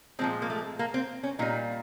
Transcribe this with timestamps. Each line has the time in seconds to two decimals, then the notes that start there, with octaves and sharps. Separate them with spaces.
0.19 A#2 F3 G#3 C4
0.42 A#3
0.50 A3
0.79 A#3
0.94 C4
1.23 C#4
1.39 A#2 G3 D#4